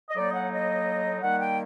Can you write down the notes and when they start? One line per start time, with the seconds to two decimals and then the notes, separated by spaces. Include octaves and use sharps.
0.09 D#5
0.15 A2 F#3 A#3 D#4 D5
0.29 D#5
0.33 F#5
0.51 D#5
1.21 D#3 G3 A#3 F#5
1.39 G5